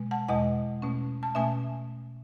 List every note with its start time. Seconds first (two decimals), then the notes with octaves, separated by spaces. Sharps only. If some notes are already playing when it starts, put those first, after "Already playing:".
Already playing: B2 G#3
0.11 F#5 A5
0.28 E2 B2 G#3 D#5 F#5
0.82 B2 A3 C#4
1.23 A5
1.35 B2 A3 C#4 E5 G#5